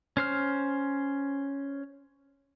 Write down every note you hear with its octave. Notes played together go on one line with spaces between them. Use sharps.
C#4 C5 F6